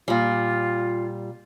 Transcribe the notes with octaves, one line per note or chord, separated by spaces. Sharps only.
A#2 G3 F4